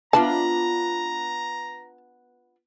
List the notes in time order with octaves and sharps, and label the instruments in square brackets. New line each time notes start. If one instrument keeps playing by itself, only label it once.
[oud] B3 D4 F4 [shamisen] A5 [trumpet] A#5